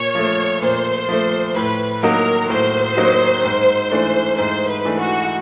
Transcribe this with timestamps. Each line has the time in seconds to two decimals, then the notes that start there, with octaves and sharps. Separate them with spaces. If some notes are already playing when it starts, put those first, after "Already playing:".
Already playing: A#2 C#5
0.15 F3 A3
0.62 A#2 C5
1.09 F3 A3
1.56 A2 B4
2.03 F#3 A#3 D#4 F#4 A#4
2.50 A2 C5
2.97 F#3 A#3 D#4 F#4
3.44 G#2
3.91 E3 A3 D4
4.38 G#2 C5
4.69 B4
4.85 E3 A3 D4
5.01 F#4